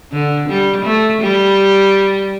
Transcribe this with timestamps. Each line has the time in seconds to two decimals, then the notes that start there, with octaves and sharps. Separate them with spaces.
0.12 D3
0.49 G3
0.85 A3
1.21 G3